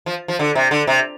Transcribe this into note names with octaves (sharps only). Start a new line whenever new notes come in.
F3
F3
D3
C3
D3
C3